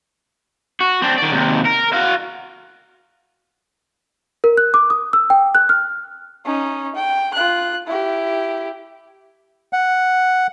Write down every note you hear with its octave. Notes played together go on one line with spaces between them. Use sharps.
F#4
C4 D4
D#3 D5
D#2 C3
A#4
F#4 F5
A#4
F#6
D6
D#6
E6
G5
F#6
F6
C#4 D#4
G5
F4 F#6
E4 G4
F#5